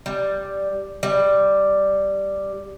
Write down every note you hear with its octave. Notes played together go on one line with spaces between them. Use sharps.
G3
G3